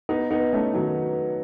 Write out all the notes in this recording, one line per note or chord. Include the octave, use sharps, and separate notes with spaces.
B3 D#4
B3 D#4
A3 C#4
D#3 F#3